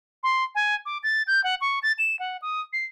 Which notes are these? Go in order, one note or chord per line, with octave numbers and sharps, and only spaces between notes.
C6
G#5
D6
A6
G6
F#5
C#6
A6
E7
F#5
D#6
C7